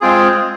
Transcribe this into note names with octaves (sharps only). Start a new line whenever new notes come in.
G#3 C4 F4 G#4